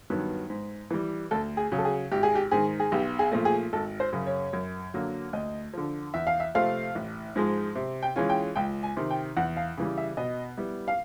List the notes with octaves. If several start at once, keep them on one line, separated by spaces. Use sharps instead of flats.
G2 D#3 F#3 B3
G#2
E3 G3
D2 A4
G#4
C#3 F#3
A4
G#4
G#1 G4
G#4
G4
G#2 D#3 G#4
G#4
B1 G4
G#4
A#2 F3 A3
G#4
G#1 A4
C5
F#2 C#3
C#5
F#2
D3 F#3 A#3
D2 D#5
D3 F3
E2 E5
F5
E5
C3 F3 A3 C4 F5
A1
G#2 F3 G#3
C3
G5
E3 G#3 C#4 F4
G5
C#2 G5
G#5
C3 D#3
G5
E2 F#5
F5
C#3 E3 G3
E5
B2 D#5
G3 B3 E4
F5